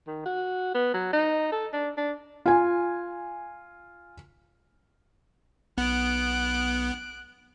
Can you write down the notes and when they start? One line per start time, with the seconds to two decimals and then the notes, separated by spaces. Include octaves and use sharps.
0.07 D#3
0.26 F#4
0.74 B3
0.94 F#3
1.13 D#4
1.52 A4
1.73 D4
1.97 D4
2.46 F4 G#5
5.78 B1 B3 F#6 D7